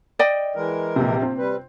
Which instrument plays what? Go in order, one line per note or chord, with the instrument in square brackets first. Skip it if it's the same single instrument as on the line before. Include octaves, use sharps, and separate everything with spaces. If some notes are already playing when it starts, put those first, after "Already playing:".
[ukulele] D5 D#5 G5
[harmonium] E3 G#3 A#4
[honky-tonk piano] A#1 C3
C4
[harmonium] G3 B4